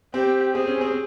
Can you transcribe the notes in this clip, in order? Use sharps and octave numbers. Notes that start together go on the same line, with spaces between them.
C4 G4
C4 G#4
C#4
C4